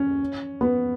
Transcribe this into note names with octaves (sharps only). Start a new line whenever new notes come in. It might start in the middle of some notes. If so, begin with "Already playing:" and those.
Already playing: C#4
B3